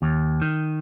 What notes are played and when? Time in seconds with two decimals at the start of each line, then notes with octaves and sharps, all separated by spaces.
0.02 D#2
0.42 D#3